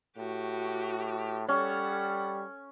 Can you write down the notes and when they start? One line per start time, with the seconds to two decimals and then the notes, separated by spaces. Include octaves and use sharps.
0.17 A2 F#4 G4
1.48 G3 C#4 A4 F#5